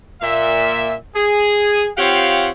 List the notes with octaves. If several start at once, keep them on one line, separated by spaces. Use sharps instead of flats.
A#2 E5
G#4
C4 F4 G4 C#5 F5 F#5